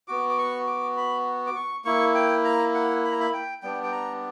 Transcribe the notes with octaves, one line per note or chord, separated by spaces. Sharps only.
B3 F#4 D6
D6
C#6
D6
B5
D6
C#6
A#3 E4 C#6
G5
A#5
F#5
B5
A#5
B5
G5
G3 B3 D4 G5
G5
A#5